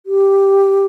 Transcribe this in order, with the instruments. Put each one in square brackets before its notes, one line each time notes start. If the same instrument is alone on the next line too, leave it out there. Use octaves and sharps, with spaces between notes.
[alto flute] G4